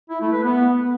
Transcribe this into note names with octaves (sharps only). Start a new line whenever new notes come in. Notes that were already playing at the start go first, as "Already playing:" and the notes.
E4
A3
B4
B3